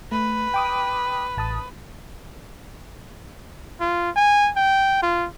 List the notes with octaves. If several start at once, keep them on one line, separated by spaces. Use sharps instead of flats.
A3 B4
G5 D6 D#6
A1 A5 D#6
F4
G#5
G5
F4